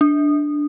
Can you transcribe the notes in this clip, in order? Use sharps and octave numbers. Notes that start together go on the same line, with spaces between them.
D4